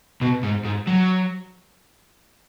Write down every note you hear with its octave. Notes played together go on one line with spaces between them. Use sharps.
B2
G#2
G#2
F#3